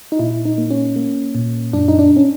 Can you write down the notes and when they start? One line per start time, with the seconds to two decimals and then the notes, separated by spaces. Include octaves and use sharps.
0.12 D#4
0.19 A#2 E4
0.45 D#4
0.58 A#3
0.71 C#4
0.96 A#3
1.35 A#2
1.73 F#2 D4
1.88 D#4
1.99 D4
2.16 C#4